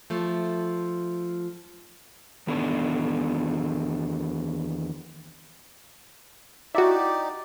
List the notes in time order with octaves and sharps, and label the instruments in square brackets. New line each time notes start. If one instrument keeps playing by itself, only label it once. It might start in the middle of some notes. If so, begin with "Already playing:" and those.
[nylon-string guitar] F3 A3
[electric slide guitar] E2 D#3 B3 D4 A4 D5
[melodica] D#4 G4 D5 [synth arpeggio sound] E4 F#4